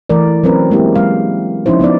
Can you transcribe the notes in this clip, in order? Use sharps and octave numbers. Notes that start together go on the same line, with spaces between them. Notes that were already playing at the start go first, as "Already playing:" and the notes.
E3 A3 A#4 D5
F#3 C4 C#4 A#4 B4
G#3 A#3 C4 E4 G4
F#3 G#3 F5
F3 C#4 D#4 E4 C5
F3 B3 D#4 D5